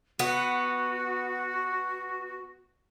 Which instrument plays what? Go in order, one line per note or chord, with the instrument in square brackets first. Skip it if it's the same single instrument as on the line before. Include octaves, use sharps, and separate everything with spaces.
[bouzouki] B3 [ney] F#4